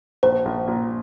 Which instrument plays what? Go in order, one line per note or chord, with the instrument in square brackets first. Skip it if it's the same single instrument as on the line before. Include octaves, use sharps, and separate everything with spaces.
[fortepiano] A#1 [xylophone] C5
[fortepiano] A#1
A#2